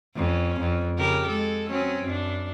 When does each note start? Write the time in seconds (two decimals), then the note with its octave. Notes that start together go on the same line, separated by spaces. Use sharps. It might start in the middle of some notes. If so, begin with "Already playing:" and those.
0.16 F2 C#4
0.60 F2
0.98 C#3 G4 A#4
1.27 G#3 A4
1.70 F#3 C4 C#4
2.04 F#2 D4